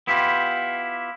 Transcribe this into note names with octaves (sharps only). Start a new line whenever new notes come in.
B3 E4 F4 G4